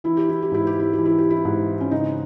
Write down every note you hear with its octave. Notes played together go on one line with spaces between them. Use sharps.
E3 E4
G4
E4
G4
G#2 E4
G4
E4
G4
E3
E4
G4
E4
G#2
C#4
C#3 D#4